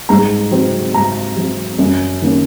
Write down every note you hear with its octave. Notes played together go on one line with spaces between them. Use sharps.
G#2 A#5
F#3 C4
G#2 A#5
F#3 C4
F#2
D#3 A#3 C#4